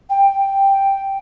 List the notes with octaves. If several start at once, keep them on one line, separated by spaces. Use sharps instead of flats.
G5